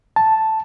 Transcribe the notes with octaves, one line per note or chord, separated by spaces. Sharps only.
A5